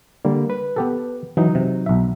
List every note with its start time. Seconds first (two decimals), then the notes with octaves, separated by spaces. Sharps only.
0.25 D3 G3 A#3
0.50 B4
0.76 B3 G4 A4
1.37 E3 F#3 D#4
1.55 C3
1.86 B1 E5